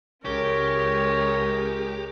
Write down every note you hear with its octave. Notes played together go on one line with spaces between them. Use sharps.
C#2 G#3 C#4 G4 A#4 C#5